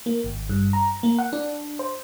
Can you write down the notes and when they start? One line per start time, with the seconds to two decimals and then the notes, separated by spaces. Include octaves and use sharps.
0.06 A#3
0.24 G#1
0.49 G2
0.73 A#5
1.03 A#3
1.18 F#5
1.33 D4
1.79 C5